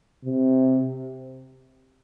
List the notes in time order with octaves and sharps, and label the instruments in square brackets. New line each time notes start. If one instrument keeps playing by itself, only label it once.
[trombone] C3